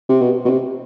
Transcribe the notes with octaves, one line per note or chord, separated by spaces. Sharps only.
C3
B2
B2
C3